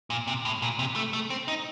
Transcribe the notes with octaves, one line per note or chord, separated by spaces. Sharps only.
A#2
C3
A2
A#2
C3
A3
A3
C4
D#4